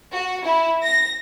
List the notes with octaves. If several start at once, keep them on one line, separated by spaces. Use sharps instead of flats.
F#4
E4
A#6